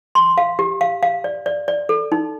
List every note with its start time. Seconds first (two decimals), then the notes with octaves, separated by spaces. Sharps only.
0.15 C6
0.38 F5
0.59 G4
0.81 F5
1.03 F5
1.24 D5
1.46 D5
1.68 D5
1.89 A4
2.12 D#4